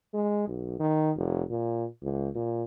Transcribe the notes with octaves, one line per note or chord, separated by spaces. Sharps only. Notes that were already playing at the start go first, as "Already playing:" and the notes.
G#3
B1
D#3
F1
A#2
C#2
A#2